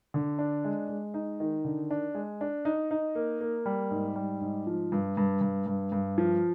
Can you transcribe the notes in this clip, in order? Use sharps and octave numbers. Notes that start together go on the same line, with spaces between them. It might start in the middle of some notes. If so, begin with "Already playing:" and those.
D3
D4
G#3
G#3
D#4
D#3
D3
D4
G#3
D4
D#4
D#4
A#3
A#3
G3
G#2
G3
G#2
F3
G2
G2
G2
G2
G2
F3